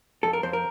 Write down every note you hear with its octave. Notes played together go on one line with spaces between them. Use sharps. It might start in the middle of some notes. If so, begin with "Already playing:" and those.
F2 A4
A#4
F2 C5
A#4